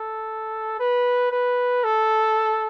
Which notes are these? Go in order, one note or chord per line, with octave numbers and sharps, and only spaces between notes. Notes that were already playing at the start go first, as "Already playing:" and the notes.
Already playing: A4
B4
B4
A4